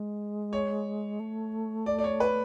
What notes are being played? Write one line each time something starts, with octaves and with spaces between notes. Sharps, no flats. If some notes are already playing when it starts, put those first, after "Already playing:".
Already playing: G#3
C#5
A3
D5
D5
C#5
B4